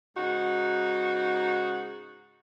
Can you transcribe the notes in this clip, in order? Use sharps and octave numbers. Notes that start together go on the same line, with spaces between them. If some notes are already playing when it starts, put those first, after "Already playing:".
G#2 C#3 D#4 F#4